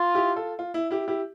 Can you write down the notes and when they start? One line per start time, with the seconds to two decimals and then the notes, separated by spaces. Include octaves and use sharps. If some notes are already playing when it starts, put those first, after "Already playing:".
Already playing: F4
0.14 E4 G4
0.36 F4 A4
0.59 F4
0.74 E4
0.90 E4 G4
1.08 E4 G4